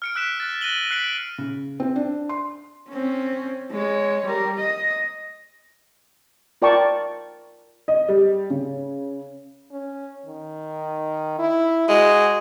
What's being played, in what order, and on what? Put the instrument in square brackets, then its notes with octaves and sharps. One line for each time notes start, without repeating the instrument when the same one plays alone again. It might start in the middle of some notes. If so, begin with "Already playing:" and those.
[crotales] F6 C#7 D7
E6 F#6 B6 E7
F#6 A6
F#6 A#6 D#7 E7 F#7 G7
F#6 B6 C7 D7 F#7
[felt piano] C#3
C4
D4
C6
[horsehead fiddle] C4 C#4
G#3 C#5
G3 A#4
D#5
[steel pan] F4 A#4 D5 G5 A5 C#6
[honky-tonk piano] D#5
G3
C#3
[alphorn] C#4
D#3
E4
[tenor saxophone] G#3 [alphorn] F#4